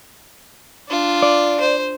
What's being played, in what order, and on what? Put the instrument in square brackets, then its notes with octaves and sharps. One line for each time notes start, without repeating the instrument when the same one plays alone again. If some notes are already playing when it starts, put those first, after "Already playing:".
[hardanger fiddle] D4 F4
[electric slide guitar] D5
[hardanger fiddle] C5